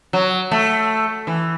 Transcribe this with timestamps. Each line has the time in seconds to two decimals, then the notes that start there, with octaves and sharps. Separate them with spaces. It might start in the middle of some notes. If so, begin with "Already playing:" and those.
0.13 F#3
0.51 A3
1.27 E3